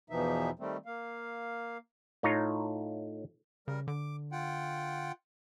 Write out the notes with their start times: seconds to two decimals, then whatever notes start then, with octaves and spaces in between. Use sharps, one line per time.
0.10 E2 B2 E3 F3 D#4 E5
0.59 D#3 G3 A3 C4
0.86 A#3 F5
2.23 A2 D#4 F4 C#5 A#5
3.68 C#3 G3 A#4
3.88 D3 D6
4.32 F4 F#5 G5